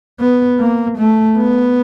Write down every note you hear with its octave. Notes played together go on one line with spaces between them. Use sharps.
B3
A#3
A3
B3